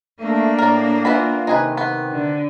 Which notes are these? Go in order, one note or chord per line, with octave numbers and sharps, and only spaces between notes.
A3 A#3 D4
A2 A#4 D5
E3 B3 F4 B5
C3 D#3 D#4 G#4 B4
B3
D3